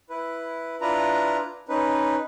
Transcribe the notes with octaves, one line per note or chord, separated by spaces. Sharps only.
E4 B4
D4 E4 F4 B4 A#5
C#4 D#4 B4